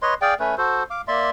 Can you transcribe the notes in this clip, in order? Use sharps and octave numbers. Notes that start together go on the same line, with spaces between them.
B4 C#5 D#5 C6
G#4 D5 F5 G5
A3 C#4 B4
F#4 A4 C5
F5 D6
A#3 D5 E5 C6